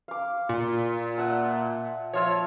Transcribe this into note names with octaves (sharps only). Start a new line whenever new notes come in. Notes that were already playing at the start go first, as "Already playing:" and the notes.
F5 D6
A#2
E5 F#5 A5
F3 F4 C#5 E5